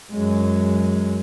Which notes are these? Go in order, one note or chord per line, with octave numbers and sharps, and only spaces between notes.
F#2 G#3